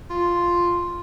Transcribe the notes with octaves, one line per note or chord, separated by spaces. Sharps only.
F4